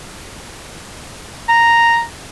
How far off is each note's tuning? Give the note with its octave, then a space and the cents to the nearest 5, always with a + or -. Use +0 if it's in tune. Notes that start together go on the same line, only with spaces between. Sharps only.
A#5 -5